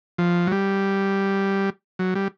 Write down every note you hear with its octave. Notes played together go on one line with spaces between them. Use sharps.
F3
F#3
G3
F#3
G3